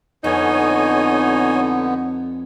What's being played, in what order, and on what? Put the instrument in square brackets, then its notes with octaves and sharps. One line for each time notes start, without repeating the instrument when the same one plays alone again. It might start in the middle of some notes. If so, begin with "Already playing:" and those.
[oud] F2 [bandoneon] D3 B3 [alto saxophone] D#4 [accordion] C#5 G#5